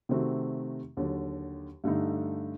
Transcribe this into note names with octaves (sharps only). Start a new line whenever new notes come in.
C3 D#3 A3 C4 F#4
D#2 D3 F#3
G2 D3 A3 D#4